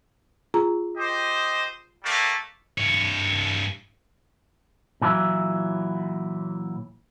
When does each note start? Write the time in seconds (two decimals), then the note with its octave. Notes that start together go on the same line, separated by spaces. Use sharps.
0.54 F4 G#4 A#5
0.97 G4 C5 D#5
2.02 G3 A3 A#3
2.78 G2 C#5
5.02 A#2 E3 F#3 E4